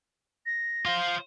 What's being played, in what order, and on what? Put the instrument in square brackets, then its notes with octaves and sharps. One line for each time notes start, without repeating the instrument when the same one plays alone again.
[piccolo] A#6
[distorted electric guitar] F4 C5 [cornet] F5